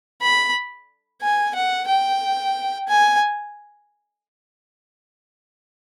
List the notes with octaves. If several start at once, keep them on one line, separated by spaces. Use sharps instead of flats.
B5
G#5
F#5
G5
G#5